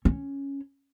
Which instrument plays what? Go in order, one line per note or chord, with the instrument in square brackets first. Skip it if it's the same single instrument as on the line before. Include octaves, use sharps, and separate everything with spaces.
[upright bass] C#4